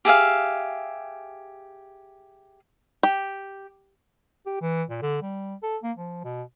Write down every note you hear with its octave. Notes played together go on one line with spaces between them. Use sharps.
G4 G#4 E5 F5
G4
G4
E3
A#2
D3
G3
A4
A#3
F3
B2